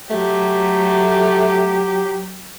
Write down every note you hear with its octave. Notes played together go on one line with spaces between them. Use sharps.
F#3 A3 G4